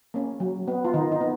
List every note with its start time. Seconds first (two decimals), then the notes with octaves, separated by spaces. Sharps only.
0.14 A#3 C#4
0.40 F#3
0.68 B3
0.85 F4
0.94 D#3 D#4
1.12 D#4
1.21 B3